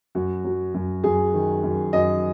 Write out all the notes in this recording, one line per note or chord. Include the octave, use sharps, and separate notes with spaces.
F#2 F#4
F#3
F#2
F#2 G#4
D#3
F#2
F#2 D#5